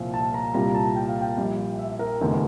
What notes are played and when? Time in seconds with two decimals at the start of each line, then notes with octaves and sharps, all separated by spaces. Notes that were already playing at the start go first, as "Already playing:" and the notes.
Already playing: C2 A#2 F3
0.14 A5
0.34 A#5
0.54 C2 A#2 G3 A#5
0.75 A5
0.96 G5
1.08 F5
1.21 G5
1.37 A#1 A#2 G3
1.79 E5
1.99 A#4
2.21 F1 E2 D3